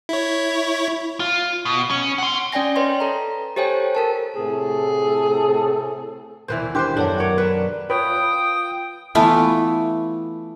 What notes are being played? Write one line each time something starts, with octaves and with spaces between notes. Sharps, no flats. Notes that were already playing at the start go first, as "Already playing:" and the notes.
E4 C#5
F4
B2
C#4
F#5 C6
C#4 D5 G5 G#5 A#6
B4 C#5 D#5 C6
A4 A#5
G4 A4 C5 C#5 G5 G#5
A4 A#4 A5
A2 C3 G#4 A4
D#1 B2 E3 B4 C5
D4 G4 B4 C5 C6 D6
F#2 D4 A4 C#5 F#5
A#4 C#5 D6
C#4 D4 B4
F4 B4 C#5 G5 D#6
E3 A3 B3 F4